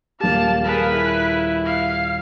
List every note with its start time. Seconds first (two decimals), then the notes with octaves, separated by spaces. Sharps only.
0.20 D#1 A#3 G4 F5 A5
0.65 G#4 A#4 B4 F5
0.93 E4
1.66 F5